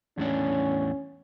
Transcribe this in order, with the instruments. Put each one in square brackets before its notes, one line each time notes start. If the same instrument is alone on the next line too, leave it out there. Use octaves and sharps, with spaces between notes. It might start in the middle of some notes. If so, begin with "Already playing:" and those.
[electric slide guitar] E2 A2 D4 [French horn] C#4